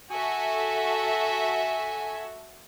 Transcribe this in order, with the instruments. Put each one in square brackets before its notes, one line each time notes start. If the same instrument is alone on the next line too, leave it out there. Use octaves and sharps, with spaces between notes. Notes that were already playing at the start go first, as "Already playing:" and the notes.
[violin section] F#4 A4 E5 [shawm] G#5